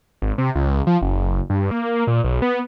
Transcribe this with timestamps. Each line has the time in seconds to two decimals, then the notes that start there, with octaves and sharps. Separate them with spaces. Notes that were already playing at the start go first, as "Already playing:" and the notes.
0.22 G#1
0.38 C3
0.55 C#2
0.87 F3
1.02 F#1
1.50 G2
1.71 A#3
2.07 A#2
2.24 B1
2.42 B3